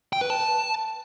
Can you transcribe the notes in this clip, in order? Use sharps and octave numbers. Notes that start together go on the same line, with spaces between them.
G5
B4
A5